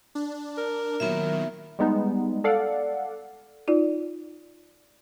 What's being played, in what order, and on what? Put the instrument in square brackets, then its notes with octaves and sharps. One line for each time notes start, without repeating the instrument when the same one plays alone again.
[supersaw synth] D4
[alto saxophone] A#4
[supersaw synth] A#2 D#3 F#3 [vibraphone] B3 E5
[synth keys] G3 G#3 B3 D#4
A4 D5 F5 F#5
[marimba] D#4 F4 D5